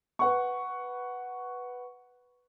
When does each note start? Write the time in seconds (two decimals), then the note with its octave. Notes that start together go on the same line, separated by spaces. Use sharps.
0.19 B4 F#5 C#6